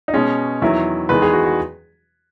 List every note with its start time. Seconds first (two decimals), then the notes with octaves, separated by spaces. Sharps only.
0.08 D#4
0.14 B2 G#3 C#4
0.62 E2 D#3 F#3 E4
1.09 E2 D#3 G#3 B4
1.22 G#4
1.33 F#4
1.46 F#4